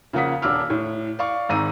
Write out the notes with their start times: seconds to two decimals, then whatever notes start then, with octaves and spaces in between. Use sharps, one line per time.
0.13 C#3 F3 A#3 F#5 D#6 B6
0.42 D#1 D4 D6 E6 F6
0.70 A2
1.19 D5 F5 C#6
1.49 G#1 G#2 A#5 E6 D#7